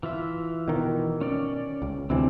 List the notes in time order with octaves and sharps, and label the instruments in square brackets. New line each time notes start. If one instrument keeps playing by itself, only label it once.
[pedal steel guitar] E3 F4 E5
[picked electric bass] B2 D#3
[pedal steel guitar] C#4 D5
[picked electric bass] C#2
[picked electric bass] D2 C3 E3 [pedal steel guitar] C4 D4